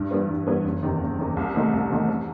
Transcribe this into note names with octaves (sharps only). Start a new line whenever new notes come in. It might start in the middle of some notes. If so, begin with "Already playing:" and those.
Already playing: G2
E3 G3 B3
G2
E3 G3 B3
F#1
E2 C3 D#3
F#1
E2 C3 D#3
C2
C3 D#3 A3 D#4
C2
C3 D#3 A3 D#4
E2